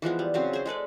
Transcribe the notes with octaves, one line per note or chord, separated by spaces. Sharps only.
E3 F3 G#3 B3
G3
C#3 F#3 C4
G#4 C5
G#3 A4 B4 D5